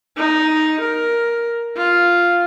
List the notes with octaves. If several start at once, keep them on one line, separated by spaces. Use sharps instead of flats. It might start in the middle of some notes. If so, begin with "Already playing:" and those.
D#4
A#4
F4